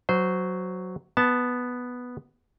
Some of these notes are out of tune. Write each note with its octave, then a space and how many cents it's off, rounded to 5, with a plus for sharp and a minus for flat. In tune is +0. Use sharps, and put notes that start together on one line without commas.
F#3 +0 C5 -15
B3 +0 A5 +0